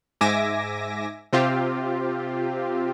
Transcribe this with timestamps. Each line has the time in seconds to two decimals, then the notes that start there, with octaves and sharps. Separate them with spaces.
0.21 G#2 E5 G#5 D6 A#6
1.33 C3 C4 F4 G4